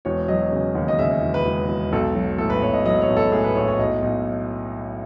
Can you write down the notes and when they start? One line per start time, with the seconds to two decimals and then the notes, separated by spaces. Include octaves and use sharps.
0.05 E1 C#5
0.28 F#3 D#5
0.52 C#3
0.75 D#2
0.88 D#5
0.99 C#3 E5
1.22 E1
1.34 B4
1.45 E1
1.69 E1
1.92 B1 A4
2.15 F#3
2.38 A2 A4
2.50 B4
2.62 B1 C#5
2.73 D#5
2.86 F#3 D#5
3.02 C#5
3.08 B1
3.17 A4
3.32 A2 G#4
3.44 B4
3.55 B1 C#5
3.68 C#5
3.78 B1 D#5
4.02 B1